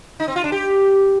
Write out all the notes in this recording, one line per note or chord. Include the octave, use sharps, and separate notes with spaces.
D#4
C4
F4
D4
G4